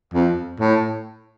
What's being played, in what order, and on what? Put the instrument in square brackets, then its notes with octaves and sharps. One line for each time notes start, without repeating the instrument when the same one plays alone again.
[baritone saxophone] F2
A2